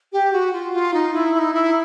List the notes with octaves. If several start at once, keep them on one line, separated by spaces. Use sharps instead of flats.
G4
F#4
F4
F4
D#4
E4
E4
D#4
E4